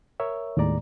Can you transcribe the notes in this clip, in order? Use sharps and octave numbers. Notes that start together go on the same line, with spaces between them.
A#4 C#5 E5
D#2 A2 G#3 D5 A#5